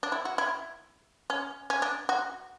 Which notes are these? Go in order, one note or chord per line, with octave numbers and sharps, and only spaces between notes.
D4
E4
F#4
E4
C#4
C#4
D4
F#4